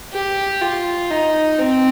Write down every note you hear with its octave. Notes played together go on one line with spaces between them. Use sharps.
G4
F4
D#4
C4